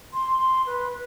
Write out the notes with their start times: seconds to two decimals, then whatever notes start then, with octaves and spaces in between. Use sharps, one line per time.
0.13 C6
0.67 B4